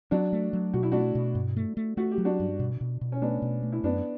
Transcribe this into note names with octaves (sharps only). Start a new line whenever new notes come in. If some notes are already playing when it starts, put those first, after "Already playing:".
F#3 D4 F#4
A3
F#3
B2 F#4
E4
A3 D4 F#4
B2
G2
A3
A3
A3 F#4
G4
F#3
D4 F#4
G2
B2
B2
B2
C#4
A3 B3 D4
B2
A3
E4
F#2 B3 D4